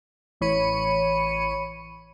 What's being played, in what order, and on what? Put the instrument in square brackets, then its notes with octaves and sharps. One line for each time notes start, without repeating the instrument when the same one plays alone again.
[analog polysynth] A1 E3 C#5 B5 C#7 D#7